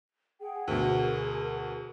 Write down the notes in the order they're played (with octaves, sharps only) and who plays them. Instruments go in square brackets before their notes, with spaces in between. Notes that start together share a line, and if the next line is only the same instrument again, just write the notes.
[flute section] G#4 F#5 G5
[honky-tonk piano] D2 B2 [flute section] G#4 A#4